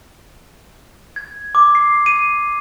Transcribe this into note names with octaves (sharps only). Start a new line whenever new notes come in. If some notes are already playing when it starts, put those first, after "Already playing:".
G#6
D6
C7
D#7